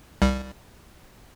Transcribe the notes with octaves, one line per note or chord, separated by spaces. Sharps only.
C2 G3